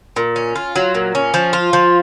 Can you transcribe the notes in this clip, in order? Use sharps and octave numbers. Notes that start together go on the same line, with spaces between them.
A#2
C#4
F4
F#3
A#2
C#4
F3
F4
F3